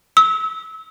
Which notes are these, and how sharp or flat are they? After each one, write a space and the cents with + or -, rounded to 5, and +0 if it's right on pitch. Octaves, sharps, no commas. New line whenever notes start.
E6 -30